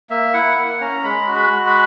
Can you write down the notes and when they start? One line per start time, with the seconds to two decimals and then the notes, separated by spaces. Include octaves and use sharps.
0.10 A#3 E5
0.34 E4 F#5
0.57 A#3 F#5
0.80 C#4 A#5
1.04 G#3 B5
1.28 F#4
1.35 B5
1.51 G#3
1.67 B5